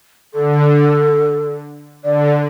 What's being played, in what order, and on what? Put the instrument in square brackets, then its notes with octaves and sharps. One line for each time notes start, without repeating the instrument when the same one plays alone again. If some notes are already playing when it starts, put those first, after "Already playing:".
[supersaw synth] D3 [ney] A4
[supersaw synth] D3 [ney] D5